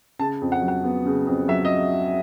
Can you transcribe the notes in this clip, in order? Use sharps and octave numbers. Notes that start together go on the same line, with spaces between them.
C#3 A5
F2
F#5
F#3
F#5
B3
C#3
F2
F#3 E5
D#5